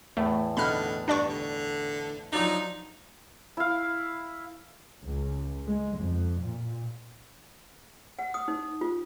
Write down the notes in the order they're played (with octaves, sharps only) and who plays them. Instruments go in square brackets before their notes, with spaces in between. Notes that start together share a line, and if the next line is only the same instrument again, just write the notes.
[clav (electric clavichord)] E2 A2 [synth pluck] A3
[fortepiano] B2 D#4 F#5 [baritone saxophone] D3 [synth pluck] B5 F6
[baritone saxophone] G2 [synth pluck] D4 D5 C#6
[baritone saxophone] D3
[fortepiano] F3 F#3 D4 [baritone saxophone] D#4 [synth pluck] D5 A#5
[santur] E4 F5
[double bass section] C#2
G#3
F2
A#2
[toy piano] F#5
D#6
D#4
F4